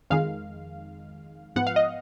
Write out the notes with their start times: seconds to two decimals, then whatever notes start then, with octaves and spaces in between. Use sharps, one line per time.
0.10 F2 D#3 G#3 F5
1.56 G#2 F3 B3 F#5
1.67 F5
1.76 D#5